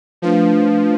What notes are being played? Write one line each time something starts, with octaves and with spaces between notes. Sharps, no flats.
F3 A3 D4 F4 B4 F5